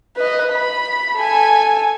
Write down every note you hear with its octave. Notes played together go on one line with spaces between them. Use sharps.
B4 D#5
B5
A4 G#5